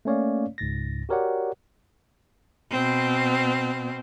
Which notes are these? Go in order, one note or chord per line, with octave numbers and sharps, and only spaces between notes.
A3 A#3 C#4 C#5 D5 F5
C#2 G#2 A6 A#6
F#4 G4 A#4 C#5 D5 F#5
B2 C4